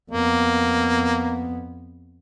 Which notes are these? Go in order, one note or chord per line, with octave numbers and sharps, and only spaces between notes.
F2 A#3 B3